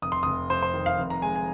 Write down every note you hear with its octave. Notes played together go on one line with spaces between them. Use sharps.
F1 D#6
C6
F1 D#6
F2 C5
C5
D#3
F5
F1
A#5
G#3 G#5
G#5